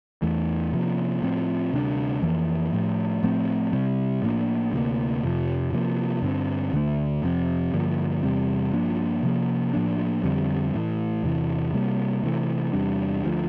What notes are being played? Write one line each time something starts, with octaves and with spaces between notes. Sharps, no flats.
E2 E3 A3
C3 F3 A#3
A2 F3 C4
D2 C3 G3 D4
F2 E3 A#3
A2 F3 A3
A2 F3 A3 C4
C3 G3 C4
A2 F3 A#3 D4
D2 C3 G3 A#3
F2 C3 F3
C3 F3 A#3
G2 D3 A3 C4
D2 D3 F3 A3
F2 C3 F3 C4
G2 D3 F3 A#3
E2 C3 G3 C4
G2 F3 A#3 D4
C3 F3 A#3
A2 F3 A#3 D4
F2 D3 G3 C4
A2 E3 A3
E2 C3 E3
C3 G3 A#3
C3 E3 A3
E2 C3 G3 D4
D2 D3 F3 A3